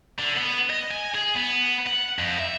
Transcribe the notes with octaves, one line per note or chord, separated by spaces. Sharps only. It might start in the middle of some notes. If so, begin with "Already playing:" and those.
D3
B3
D#5
G#5
G#4
B3
F#5
F2
E5